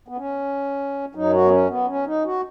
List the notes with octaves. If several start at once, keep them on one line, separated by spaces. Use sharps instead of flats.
B3
C#4
F#2 F#3 D#4
F#4
B3
C#4
B3
C#4
D#4
F#4